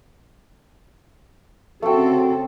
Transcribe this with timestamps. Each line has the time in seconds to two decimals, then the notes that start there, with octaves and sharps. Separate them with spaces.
1.82 C#3 A3 C4 F#4 A4 G5